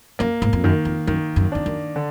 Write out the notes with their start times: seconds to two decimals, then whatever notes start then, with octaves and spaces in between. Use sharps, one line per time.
0.19 F#2 A#3
0.42 G#2
0.53 F2
0.64 F#2 D#3
0.85 F2
1.07 F#2 D#3
1.36 F#2
1.52 F2 D4
1.66 F#2
1.96 D3